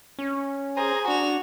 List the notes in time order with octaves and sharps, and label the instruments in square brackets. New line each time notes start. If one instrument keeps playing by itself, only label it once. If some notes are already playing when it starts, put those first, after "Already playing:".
[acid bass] C#4
[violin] G#4 [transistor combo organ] C5 A#5
[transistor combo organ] D4 [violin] F#4 F7